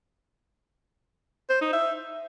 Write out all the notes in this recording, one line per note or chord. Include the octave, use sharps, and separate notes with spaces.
C5
D#4
E5